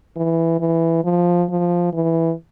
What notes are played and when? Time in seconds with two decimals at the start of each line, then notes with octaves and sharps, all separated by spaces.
0.16 E3
0.60 E3
1.04 F3
1.49 F3
1.93 E3